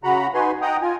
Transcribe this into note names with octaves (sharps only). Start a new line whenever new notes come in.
C#3 F#4 F#5 A#5 B5
D#4 F#4 B4 G#5 C6
D#5 F#5 G5 A#5 D#6
F4 G#5